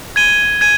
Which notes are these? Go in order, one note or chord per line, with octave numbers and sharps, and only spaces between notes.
G#6 D#7 G7
G#6 D#7